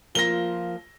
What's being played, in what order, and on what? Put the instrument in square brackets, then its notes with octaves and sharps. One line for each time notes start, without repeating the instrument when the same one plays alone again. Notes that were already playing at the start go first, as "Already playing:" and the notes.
[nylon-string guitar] F3 A#3 A#4 [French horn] F4 [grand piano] A#6 G7